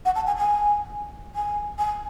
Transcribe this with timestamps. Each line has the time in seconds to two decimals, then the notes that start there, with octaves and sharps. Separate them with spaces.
0.05 F#5
0.15 A5
0.26 G#5
0.37 G#5
1.35 G#5
1.78 G#5